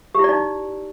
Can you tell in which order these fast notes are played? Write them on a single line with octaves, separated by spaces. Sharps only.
G4 E4 D5 D#4